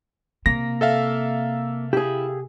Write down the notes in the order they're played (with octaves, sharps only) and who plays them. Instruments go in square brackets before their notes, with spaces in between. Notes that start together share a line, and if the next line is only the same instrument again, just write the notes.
[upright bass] C3 [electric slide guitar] A#3 [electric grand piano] A#6
[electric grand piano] A4 E5 F5
[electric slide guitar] E4 [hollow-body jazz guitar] G4 G#4